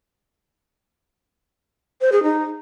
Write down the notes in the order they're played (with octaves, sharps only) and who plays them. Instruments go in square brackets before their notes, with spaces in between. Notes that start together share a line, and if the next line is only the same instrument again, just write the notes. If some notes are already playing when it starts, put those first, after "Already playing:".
[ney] C5
G#4
D#4